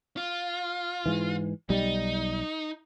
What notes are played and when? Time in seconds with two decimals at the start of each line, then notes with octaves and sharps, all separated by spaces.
0.17 F4
1.06 G#2 E3
1.70 B1 G3 D#4